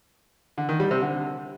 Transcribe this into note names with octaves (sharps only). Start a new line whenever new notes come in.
D3
D#3
G3
C3
D3